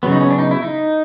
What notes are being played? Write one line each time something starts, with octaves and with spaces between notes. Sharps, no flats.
C#3 F#3 B3
D#4
C#4
D4
D#4
E4
D#4